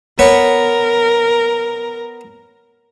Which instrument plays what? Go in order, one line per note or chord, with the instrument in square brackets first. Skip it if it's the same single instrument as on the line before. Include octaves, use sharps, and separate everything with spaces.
[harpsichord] B3 B4 C#5 [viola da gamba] A#4